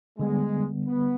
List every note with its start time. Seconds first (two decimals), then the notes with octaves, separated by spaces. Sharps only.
0.18 D3 G3 G#3 B3
0.86 B3